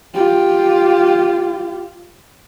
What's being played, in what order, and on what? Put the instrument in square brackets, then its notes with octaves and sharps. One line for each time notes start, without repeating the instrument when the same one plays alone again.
[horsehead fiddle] F4 G4